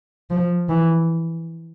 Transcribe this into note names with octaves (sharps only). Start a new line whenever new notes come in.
F3
E3